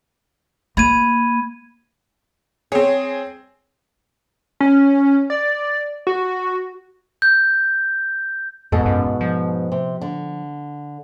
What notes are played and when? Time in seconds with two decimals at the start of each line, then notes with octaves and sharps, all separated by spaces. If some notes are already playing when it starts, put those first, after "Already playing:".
0.77 A#3 B5 G#6 D#7
2.72 C4 G#4 C#5
4.60 C#4
5.30 D5
6.07 F#4
7.22 G6
8.72 F2 G#2 B2 A4
8.86 F#2
9.21 F3
9.72 C3
10.01 D3